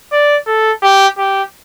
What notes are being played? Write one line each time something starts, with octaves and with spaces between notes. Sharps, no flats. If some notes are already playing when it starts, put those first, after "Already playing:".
D5
A4
G4
G4